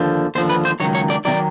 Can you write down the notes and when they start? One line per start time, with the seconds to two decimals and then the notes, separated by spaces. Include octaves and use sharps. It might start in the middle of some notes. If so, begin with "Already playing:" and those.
Already playing: D#2 D3 F3
0.35 D#2 D3 F3 C5
0.50 B4
0.65 C5
0.80 C#2 C3 D#3 F#3 C#5
0.95 C#5
1.10 D5
1.25 C3 D#3 F#3 D5